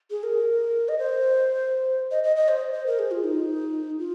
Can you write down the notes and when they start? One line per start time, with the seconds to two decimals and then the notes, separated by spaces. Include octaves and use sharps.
0.10 G#4
0.23 A#4
0.88 D#5
0.98 C5
2.11 D#5
2.23 D#5
2.36 D#5
2.48 C5
2.74 C5
2.86 A#4
2.99 G#4
3.11 F4
3.24 D#4
3.99 F4